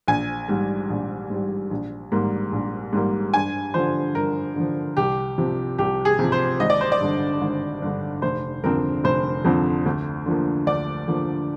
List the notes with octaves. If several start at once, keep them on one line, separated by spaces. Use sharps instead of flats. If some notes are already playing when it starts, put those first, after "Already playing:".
A#1 G#5
G#2 G3
A#1
G#2 G3
A#1
G#2 G3 A#3
A#1
G#2 G3 A#3
G2 G#5
D3 F3 C5
G2 A#4
D3 F3
C2 G4
C3 F3
C2 G4
G#4
C3 F3
C5
G#1 D#5
D5
C5
D5
G2 D3
G#1
G2 D3
F1 C5
F2 D3 F3 C4 A#4
F1 C5
F2 D3 F3 C4
D2
D3 F3 A#3
D2 D5
D3 F3 A#3